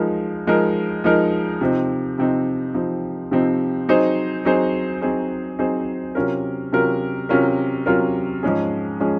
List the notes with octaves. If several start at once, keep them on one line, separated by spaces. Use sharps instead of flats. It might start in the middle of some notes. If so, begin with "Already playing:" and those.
Already playing: F3 G#3 D#4 A#4
F3 G#3 D#4 A#4
F3 G#3 D#4 A#4
C3 F3 C4 D#4
C3 F3 C4 D#4
C3 F3 C4 D#4
C3 F3 C4 D#4
F#3 C4 D#4 G#4 C5
F#3 C4 D#4 G#4 C5
F#3 C4 D#4 G#4 C5
F#3 C4 D#4 G#4 C5
C3 F#3 C#4 F4 A#4
C3 F#3 C#4 F4 A#4
C3 F#3 C#4 F4 A#4
C3 F#3 C#4 F4 A#4
G#2 F3 G#3 C#4 G#4
F3 G#3 C#4 G#4